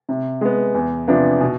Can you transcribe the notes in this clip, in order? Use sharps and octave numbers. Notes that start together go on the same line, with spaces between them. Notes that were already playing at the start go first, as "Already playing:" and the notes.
C3
G#3 B3
E2
C3 F3 B3 D4
B2